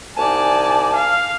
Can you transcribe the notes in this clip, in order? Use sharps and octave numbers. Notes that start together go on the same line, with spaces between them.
C2 D#4 D5 G#5 A5
F5